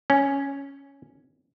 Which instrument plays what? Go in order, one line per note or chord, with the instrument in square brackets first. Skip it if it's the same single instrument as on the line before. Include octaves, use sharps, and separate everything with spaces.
[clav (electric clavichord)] C#4